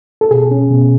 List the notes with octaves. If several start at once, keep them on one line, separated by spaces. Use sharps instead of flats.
A4
B2 G#4
C#4
B2